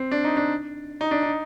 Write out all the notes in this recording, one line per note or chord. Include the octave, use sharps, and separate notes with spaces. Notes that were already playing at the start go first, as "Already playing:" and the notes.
Already playing: C4
D4
D#4
D4
D#4
D4
D#4